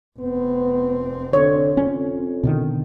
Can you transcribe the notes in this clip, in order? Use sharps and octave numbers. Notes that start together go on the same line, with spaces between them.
F1 B3 C4
D3 C#5
F2 C#4
B2 D3 D#3